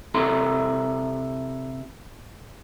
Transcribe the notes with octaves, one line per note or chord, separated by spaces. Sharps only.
C3 E4 A4 A#5 C6